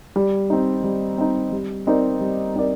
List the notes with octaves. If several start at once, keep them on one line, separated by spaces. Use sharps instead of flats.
G3
C4 D#4
G3
C4 D#4
G3
C4 D#4 A#4 D5
G3
C4 D#4 A#4 D5